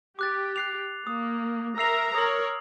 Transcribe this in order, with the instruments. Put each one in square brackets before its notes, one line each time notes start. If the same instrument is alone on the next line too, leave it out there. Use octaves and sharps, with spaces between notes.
[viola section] G4 [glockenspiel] D6 F#6 A6
[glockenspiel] F#6 C7 F7
[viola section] A#3 [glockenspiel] D#6
[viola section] A#4 E5 A#5 [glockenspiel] E6 C7 F7
[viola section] A#4 C#5 [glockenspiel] D#6 F#7